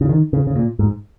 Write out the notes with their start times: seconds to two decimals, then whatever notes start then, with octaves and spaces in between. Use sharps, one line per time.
0.01 C#3
0.09 D#3
0.33 C#3
0.47 C#3
0.56 A#2
0.79 G#2